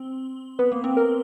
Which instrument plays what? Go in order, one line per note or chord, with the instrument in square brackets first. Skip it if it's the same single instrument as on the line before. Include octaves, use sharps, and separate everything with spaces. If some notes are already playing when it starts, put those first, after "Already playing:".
Already playing: [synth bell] C4
[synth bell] B3 [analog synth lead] B4
[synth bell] A#3
C4
[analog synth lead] A#4